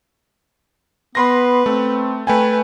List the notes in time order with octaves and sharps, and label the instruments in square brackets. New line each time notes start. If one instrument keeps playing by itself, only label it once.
[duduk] B3 [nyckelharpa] B4 [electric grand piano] B5 C6 A#6
[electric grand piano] A3 [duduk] C4
[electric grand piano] A3 G5 G#5 [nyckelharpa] B4